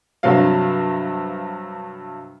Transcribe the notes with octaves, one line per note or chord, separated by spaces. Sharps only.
G2 C3 F#3 F5